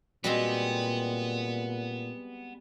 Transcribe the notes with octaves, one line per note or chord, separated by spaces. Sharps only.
A#2 G3 G#3 B3 C4 F#4 D#5